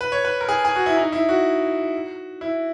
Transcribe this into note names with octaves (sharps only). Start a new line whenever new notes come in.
B4
C#5
B4
A#4
G#4
G#4
F#4
E4
D#4
E4
F#4
E4